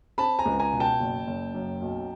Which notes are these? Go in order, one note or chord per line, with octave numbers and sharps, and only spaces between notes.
C4 A5 B5
G#5 A#5
C#2
G#5 A#5
B2
G5 A5
F#1
F#1
F#2
B1